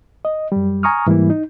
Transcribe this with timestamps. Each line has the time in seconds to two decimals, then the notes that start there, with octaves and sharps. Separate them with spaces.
0.25 D#5
0.52 F#2 G3
0.83 G#5 A#5 C#6 D#6 F6
1.06 G#2 E3 G3 A#3 E4
1.30 D#4